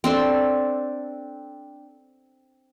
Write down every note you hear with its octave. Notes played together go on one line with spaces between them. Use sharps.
C4 D4 A4